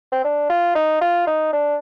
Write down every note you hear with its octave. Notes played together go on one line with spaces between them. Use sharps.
C4
D4
F4
D#4
F4
D#4
D4